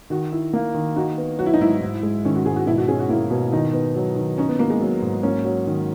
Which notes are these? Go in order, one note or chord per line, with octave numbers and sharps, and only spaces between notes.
D#3 F#4
E4
A#3
D#3
D#4 F#4
B3
F#3 F#4
E4
D#4
G#2 E4
G#2
G#3
D#3 C#4
F#4
G#2 G#4
F#4
B2 E4
F#4
C#4 G#4
F#4
A#3 E4
B2
D#3 D#4
B3
F#3
D#3
C#4 D#4
B3
A#3 B3
G#3
F#3
G#2
A#3 C#4
F#3
D#3